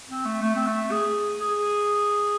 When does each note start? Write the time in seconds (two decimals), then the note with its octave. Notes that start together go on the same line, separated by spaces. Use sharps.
0.09 C4
0.25 A3
0.42 A3
0.56 C4
0.67 A3
0.91 G#4
1.41 G#4